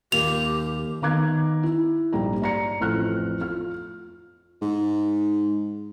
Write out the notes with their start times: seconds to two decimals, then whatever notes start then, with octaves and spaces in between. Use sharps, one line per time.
0.12 D#2 A#2 G4 F7
1.02 D#3 B3 A#5 D6 F#6 G#6
1.63 E4
2.13 A#1 G#2 G3 G4 A#5
2.42 D5 A#5 C#7
2.80 A1 F2 F6 F#6
3.41 F4 F6
4.62 G#2